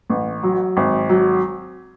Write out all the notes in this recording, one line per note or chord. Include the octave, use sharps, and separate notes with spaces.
A1
F#3
G#1
F#3